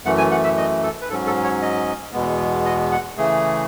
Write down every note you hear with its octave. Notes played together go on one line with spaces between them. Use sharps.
F#2 E3 A3 F#5
G#5
F#5
E5
D#5
A4
B4
G#2 F#3 C#4 A4
A4
C#5
D#5
E2 B2 G#3 B3
D#5
F#5
C#3 E3 A3 G#4